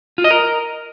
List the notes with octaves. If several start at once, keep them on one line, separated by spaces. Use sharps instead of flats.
F4
D#5
A#4